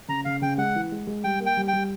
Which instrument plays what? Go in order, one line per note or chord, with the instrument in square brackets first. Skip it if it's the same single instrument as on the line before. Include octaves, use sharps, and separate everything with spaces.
[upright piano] C#3 [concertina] A#5
[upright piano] C#3 [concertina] F5
[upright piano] C#3 [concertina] G5
[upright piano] G#3 [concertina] F#5
[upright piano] E3
G#3
G#3
[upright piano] G3 [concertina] G5
[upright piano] A#3
[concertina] G5
[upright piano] G3
[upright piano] G3 [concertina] G5